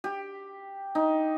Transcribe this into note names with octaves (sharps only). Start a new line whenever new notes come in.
G4
D#4